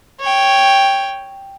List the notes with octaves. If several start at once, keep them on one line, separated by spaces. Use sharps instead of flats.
C#5 G5